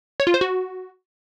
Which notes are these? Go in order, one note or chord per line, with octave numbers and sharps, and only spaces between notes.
C#5
F4
C5
F#4